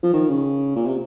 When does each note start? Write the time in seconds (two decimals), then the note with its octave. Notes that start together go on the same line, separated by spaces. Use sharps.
0.03 F3
0.13 D#3
0.29 C#3
0.76 A#2
0.86 C3